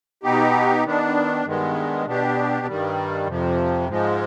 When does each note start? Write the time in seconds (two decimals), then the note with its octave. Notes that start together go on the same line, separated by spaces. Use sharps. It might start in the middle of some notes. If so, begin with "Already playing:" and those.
0.23 B2 B3 D#4 G4
0.85 D#3 B3 D4
1.45 G2 D#3 G#3 B3
2.06 B2 B3 D4 G4
2.67 G2 D#3 G3
3.27 F2 C3 F3
3.89 G#2 F3 G#3